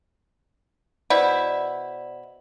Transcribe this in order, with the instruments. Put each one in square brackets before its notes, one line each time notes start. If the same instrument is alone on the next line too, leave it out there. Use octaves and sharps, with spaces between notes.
[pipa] B2 E4 [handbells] C5 D5 F#5